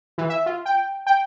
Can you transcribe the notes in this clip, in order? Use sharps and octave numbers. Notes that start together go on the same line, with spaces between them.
E3
E5
F4
G5
G5